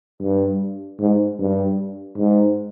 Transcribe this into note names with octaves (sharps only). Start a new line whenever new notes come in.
G2
G#2
G2
G#2